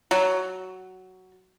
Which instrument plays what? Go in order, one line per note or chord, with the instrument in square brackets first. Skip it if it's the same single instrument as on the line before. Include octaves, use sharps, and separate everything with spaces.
[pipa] F#3